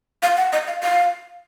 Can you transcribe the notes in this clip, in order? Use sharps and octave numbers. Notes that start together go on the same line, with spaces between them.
F5
F#5
D#5
F5
F5